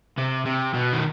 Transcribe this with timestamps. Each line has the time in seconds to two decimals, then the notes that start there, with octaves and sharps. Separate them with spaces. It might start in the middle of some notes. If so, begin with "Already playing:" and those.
0.18 C3
0.46 C3
0.74 B2
0.93 D#3